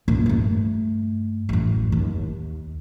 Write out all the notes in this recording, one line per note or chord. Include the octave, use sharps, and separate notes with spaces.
D#2 A#2
G2 A3
A1 F#2
D#2